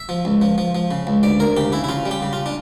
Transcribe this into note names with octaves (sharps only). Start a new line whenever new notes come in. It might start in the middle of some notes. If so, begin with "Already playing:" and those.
Already playing: E5
F3
C#2
F3
F3
F3
C#3
C#2
D2 D5
D2 A#4
C#3 G4
C#3 E4
E4
C#3 F4
G3
G4
C#3
F4
D4